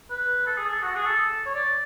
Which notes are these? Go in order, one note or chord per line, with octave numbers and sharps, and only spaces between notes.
B4
A4
G#4
A4
F#4
G#4
A4
C#5
D5